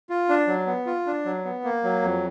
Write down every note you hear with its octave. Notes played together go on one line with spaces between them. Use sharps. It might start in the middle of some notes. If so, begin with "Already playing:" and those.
F4
D4
F#3
B3
F4
D4
F#3
B3
A#3
F#3
F2